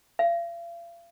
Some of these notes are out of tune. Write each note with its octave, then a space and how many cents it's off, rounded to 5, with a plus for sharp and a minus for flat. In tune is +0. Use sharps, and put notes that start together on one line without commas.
F5 -40